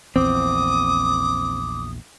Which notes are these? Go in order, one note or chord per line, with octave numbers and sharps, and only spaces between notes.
A#1 E2 C4 D6 D#6